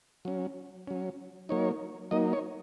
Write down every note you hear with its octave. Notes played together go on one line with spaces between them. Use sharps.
F#3 C#4
F#3 C#4
F#3 A#3 D#4 C#5
F#3 A#3 D#4 D#5
C#5